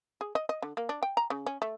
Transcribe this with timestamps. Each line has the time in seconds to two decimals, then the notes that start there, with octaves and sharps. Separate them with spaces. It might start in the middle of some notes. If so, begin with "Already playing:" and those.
0.21 G#4
0.35 D#5
0.49 D#5
0.62 D3
0.77 A#3
0.89 D4
1.03 G5
1.17 A#5
1.30 C#3
1.46 C#4
1.62 A3